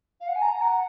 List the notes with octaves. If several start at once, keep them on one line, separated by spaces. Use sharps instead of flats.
F5
F#5
G#5
A#5
F#5